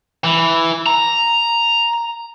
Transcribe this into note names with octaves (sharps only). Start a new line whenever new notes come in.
E3
A#5